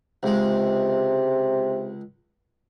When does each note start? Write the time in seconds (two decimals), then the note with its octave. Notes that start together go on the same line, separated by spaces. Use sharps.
0.23 C#2 C3 G#3